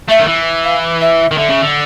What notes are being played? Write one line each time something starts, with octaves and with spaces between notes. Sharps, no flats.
A3 E5
D#3
E3
F5
E5
D#3
D3 E5
C#3
D3